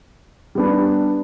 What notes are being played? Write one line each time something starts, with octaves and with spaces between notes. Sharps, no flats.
G3 B3 D4